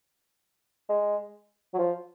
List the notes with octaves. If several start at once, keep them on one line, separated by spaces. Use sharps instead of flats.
G#3
F#3
F3